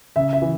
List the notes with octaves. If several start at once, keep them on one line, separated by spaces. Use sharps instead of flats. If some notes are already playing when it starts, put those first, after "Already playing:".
C#3 E5
E5
E3